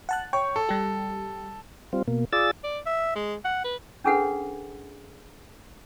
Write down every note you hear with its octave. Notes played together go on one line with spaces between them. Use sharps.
F#5 A5 F#6
C#5 G5 C#6
A4
G3 G4
G3 C4 F4
B2 A#3
F4 G#4 D5 E6 A6
D5
E5
G#3
F#5
B4
C#4 D4 G#4 A4 B4 F#5